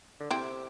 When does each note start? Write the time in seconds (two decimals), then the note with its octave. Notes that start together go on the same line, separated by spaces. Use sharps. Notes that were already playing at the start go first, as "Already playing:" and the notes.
0.20 D3
0.31 C3 C4 E4